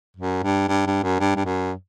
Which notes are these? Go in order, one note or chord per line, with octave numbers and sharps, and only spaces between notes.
F#2
G2
G2
G2
F#2
G2
G2
F#2